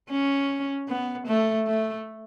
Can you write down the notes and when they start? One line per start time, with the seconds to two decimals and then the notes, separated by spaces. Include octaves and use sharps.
0.10 C#4
0.88 B3
1.27 A3
1.67 A3